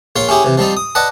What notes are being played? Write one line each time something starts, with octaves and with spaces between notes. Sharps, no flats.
A#1 F4 C#5 C6
C#4 E4 G4 G#4
C3 E3
F3 G3 C4 D#4
D#6
B4 D5 D#5 F#5 A5